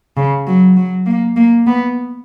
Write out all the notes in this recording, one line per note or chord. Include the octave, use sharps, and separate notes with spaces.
C#3
F#3
F#3
A#3
A#3
B3